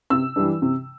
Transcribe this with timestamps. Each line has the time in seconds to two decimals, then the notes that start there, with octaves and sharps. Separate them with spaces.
0.10 C3 E6
0.36 E3 G3 D4
0.62 C3